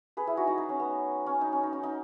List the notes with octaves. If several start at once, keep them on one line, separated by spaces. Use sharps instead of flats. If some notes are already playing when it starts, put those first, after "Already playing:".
G#4 B4
E4 G#4
D#4 F#4
D#4 F#4
D#4
C#4
B3
C#4
D#4
C#4
D#4
C#4
D#4